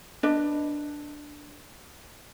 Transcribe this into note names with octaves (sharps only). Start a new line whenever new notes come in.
D4 B4 D#5